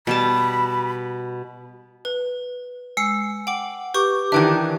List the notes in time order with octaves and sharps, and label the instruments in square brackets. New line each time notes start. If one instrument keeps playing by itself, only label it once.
[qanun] B2 G3 A5 [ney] B5
[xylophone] B4
[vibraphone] G#3 [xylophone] E6 C7 C#7
[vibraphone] F#5 [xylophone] G5 D6
[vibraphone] G4 D6 [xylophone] B4 C#6
[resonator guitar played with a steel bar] D#3 E3 D4 [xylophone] E5 G5 G#6